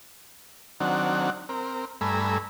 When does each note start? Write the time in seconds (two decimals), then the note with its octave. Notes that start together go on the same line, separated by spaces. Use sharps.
0.80 D#3 F#3 C4 D4 F#5
1.49 C4 A#4
2.01 G2 A3 G#5 A#5 B5 E6